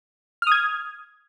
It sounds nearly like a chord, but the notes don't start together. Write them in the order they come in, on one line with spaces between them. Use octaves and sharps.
F6 D#6 G#6